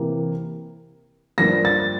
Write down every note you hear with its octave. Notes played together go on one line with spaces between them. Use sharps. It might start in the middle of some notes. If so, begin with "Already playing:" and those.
Already playing: C3 E3 A#3
G2 F3 A#3 D4 A#6
A6